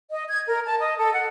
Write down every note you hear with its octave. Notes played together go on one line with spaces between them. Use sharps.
D#5
G#6
A#4
A5
D#5
A4
F#5